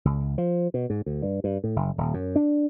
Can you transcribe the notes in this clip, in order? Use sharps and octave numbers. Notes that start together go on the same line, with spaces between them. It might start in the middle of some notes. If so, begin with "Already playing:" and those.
C#2
F3
B2
G#2
D2
G2
G2
A2
F#1
D#1
F#2
D4